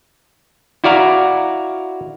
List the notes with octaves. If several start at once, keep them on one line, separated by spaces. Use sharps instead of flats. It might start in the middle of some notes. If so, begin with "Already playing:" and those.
E4 F#4 D5 F5 A#5